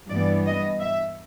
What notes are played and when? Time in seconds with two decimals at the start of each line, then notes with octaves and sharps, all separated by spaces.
0.10 G2 E3 G3 B3 D5
0.46 D#5
0.81 E5